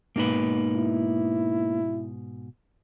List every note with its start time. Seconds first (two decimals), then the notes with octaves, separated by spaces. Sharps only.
0.16 G#2 B2 A#3 D#4 B4
0.76 E4